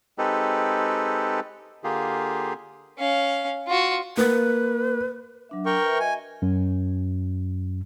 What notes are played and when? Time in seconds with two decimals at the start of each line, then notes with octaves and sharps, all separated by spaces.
0.18 G#3 C4 D#4 G4 A4 B4
1.84 D3 A#3 F4 G4 G#4
2.98 C#4 F5
3.67 F4 F#4
4.17 A#3 B4
5.49 F#3 D4 E5
5.66 A#4 G5 C#6
5.82 B4 E5
6.00 F#4 D#5 E5 G#5
6.42 F#2